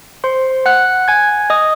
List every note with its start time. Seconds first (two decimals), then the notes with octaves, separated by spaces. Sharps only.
0.24 C5 C6
0.66 F#5 F#6
1.08 G#5 G#6
1.50 D#5 D#6